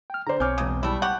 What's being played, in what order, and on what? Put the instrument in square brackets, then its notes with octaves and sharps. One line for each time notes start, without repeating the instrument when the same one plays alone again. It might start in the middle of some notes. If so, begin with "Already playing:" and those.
[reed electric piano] G5 F6
[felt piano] D3 C5 [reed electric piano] D5 A#5
[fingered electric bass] B1 [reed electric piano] C4 G#5 D6 [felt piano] C#5 F6 G6
[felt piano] E1 D#6 [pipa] C#3
[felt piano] G3 [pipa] A3 E4
[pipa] G4 F#5 [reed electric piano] A5 [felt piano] C#6 D6 G6